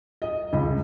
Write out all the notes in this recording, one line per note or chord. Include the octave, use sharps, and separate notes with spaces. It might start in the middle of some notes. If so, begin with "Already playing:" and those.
D#5
C#2